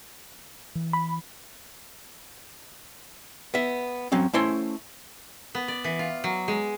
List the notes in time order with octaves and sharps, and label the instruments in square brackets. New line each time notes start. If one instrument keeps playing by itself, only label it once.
[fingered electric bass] E3
[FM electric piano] B5
[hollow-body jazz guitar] B3 E5
F#3 C4 C#4
A3 C#4 E4 C5 C6
[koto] B3
D5
E3
F4
F#3
G#3